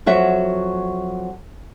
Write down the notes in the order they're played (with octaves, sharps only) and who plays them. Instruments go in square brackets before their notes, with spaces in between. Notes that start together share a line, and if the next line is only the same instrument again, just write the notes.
[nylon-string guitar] F2 F#3 F#4 E5